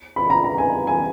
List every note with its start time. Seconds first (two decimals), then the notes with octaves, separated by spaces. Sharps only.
0.16 B5
0.30 A#5
0.44 A#5
0.58 G#5
0.87 G#5